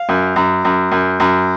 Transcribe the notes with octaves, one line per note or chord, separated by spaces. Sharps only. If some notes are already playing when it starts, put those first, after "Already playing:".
Already playing: F5
F#2
F#2
F#2
F#2
F#2